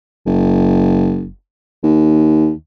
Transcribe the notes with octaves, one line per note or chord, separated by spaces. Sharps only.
F#1
D#2